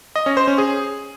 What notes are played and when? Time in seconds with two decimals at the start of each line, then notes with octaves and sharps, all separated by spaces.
0.16 D#5
0.26 C#4
0.37 C5
0.48 C#4
0.58 G#4